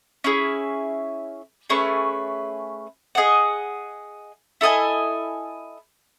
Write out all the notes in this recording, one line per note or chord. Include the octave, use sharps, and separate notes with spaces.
C#4 E4 G#4
A3 C#4 G#4 B4
G#4 D#5 F#5
E4 A4 D#5 G#5